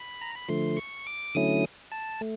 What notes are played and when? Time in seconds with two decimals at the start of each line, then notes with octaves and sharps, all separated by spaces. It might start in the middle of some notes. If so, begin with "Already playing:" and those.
Already playing: B5
0.21 A#5
0.36 B5
0.48 D3 F3 A3 C6
0.77 C#6
1.07 D6
1.35 D3 F#3 A3 C#4 E4 D#6
1.92 A5
2.21 A3